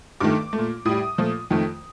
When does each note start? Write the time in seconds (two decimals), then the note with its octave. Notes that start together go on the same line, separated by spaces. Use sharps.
0.20 G2 D#3 A3 D6
0.53 A3
0.58 A#2
0.85 A2 G3 D#6
1.18 A#2 F3 A3
1.51 F2 D#3 A3